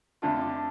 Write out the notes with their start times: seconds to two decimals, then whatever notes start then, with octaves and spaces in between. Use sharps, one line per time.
0.22 F2 D3 A3 D4 F4 A5
0.42 D6